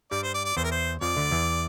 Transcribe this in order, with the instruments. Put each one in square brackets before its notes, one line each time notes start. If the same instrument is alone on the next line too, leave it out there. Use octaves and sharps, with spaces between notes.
[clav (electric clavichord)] G2 G3 [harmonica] D5
[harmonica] C5
D5
D5
[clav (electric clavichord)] E2 E3 [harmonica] C5
[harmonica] A#4
C5
[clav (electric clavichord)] F2 F3 [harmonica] D5
[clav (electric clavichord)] D2 D3
E2 E3